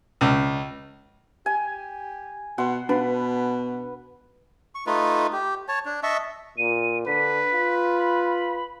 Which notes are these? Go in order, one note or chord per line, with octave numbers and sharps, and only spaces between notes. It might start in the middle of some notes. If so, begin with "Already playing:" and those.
C#2
G4 G#5
B2 F#5 C6
B2 D4 B4 F5
C#6
A3 D#4 F4 B4
G4
C#5 A5
D4
D#5 E5 A5 C#6
A#2 D#7
D3 B4 B6
F4
B5